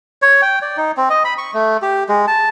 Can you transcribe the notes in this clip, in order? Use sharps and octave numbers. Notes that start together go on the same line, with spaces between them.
C#5
G5
D5
D#4
C4
D#5
B5
C#6
A3
G4
G#3
A5